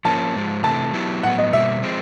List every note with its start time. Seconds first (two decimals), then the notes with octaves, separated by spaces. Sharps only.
0.05 F3 A#3 C#4 A5
0.35 G#2 F3 G#3
0.64 C3 E3 A3 A5
0.93 F#3 B3 E4 G4
1.23 A2 F#3 B3 F#5
1.39 D#5
1.53 B2 G3 A#3 E5
1.82 F3 G#3 C4